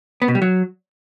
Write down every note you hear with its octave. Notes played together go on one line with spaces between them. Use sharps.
B3
B2
G3
F#3